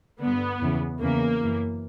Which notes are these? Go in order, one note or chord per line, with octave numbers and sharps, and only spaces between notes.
G2 D3 B3
E2 C#3 E3
E2 C#3 E3 A#3
F#2 E3